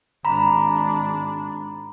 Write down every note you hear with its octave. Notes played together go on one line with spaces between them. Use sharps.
G#1 D4 A#5 B5